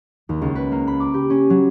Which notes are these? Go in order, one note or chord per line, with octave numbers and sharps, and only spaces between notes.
D#2
C#2
B4
A#3
B5
D6
G4
C#4
F#3